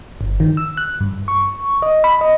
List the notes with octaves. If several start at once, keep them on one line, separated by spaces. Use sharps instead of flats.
G1
D#3
E6
F#6
G2
C#6
D#5
B5
D#5